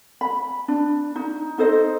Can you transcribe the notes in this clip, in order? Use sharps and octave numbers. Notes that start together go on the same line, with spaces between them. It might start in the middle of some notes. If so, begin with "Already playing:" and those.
B5
D4
D#4
D#4 A4 C5 D#5